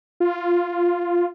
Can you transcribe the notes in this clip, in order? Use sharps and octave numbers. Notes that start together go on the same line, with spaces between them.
F4